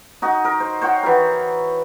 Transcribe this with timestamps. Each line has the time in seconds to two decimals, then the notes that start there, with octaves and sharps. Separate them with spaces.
0.22 D#4 F#4 D#5
0.45 A#4
0.60 C5
0.81 C5 C#5 F#5 G5
1.03 E3 F#4 A#4